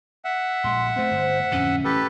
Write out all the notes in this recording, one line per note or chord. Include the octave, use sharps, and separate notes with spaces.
E5 F#5
A#1 G#3 C6
A3 C4 C5
G1
D1 F2 D3 C#4
A1 G4 A4 B4